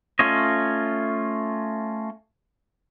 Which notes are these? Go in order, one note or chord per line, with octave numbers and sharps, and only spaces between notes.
A3 C#4 F4 C#5 D#5